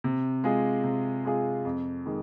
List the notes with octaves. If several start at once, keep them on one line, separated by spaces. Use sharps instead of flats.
C3
G#3 F4 G#4
C3
G#3 F4 G#4
F2
D#3 G#3